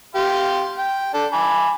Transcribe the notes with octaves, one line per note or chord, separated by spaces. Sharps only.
G4 F5 C6
G5
D4 A4
G#5 B5 D6